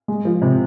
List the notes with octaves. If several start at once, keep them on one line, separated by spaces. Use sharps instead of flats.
G#3
F3
C3